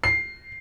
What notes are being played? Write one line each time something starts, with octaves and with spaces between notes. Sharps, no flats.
C7